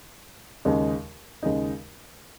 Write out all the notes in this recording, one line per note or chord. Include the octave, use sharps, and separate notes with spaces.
D#2 C#3 G#3 D#4
D#2 C#3 G#3 D#4